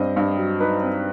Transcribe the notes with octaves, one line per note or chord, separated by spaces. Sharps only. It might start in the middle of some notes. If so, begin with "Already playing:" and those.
Already playing: G2 C4 D#5
G2
F#3
D#4 B4
C4